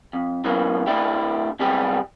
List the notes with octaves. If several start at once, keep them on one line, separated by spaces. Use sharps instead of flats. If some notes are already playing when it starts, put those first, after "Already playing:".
F2
F#2 B2 E3 F#3 A#3
A2 A3 D4 E4 G4
C3 F#3 G3 B3 G4 G#4